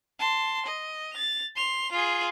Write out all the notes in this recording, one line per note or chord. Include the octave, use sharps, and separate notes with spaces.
A5 C6
D#5
A6 F7
C6 F7
F4 G#4